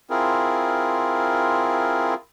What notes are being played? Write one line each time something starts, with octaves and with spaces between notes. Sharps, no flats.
C4 E4 F4 G#4 A#4